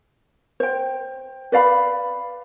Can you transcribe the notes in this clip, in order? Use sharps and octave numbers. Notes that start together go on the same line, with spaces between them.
C5 G5
B4 D5 F5 B5